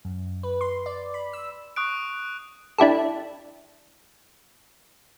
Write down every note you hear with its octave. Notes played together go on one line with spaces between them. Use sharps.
F#2
B4
C6
D5
B5
E6
C#6 D#6 F#6 D7
D4 E4 G4 A4